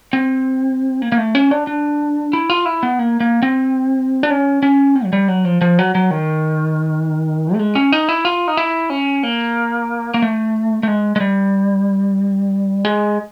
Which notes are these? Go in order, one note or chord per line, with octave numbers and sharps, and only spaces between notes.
C4
A#3
A#3
A3
C#4
D4
D4
E4
F4
E4
B3
A#3
A#3
C4
D4
C#4
C#4
C4
F#3
G3
F#3
F3
F3
F#3
F#3
D#3
A3
G#3
C#4
D#4
E4
F4
D#4
E4
C#4
A#3
A#3
A3
A3
G#3
G#3
G3
G#3